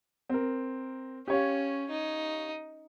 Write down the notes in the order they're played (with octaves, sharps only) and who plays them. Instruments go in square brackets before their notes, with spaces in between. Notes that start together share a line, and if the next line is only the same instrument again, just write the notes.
[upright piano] C4 A#4
[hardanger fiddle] C#4 [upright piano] G4 C#5 F5
[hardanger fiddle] D#4